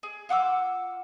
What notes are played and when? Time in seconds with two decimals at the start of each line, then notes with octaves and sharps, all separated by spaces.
0.03 G#4
0.29 F4 F#5 D6 E6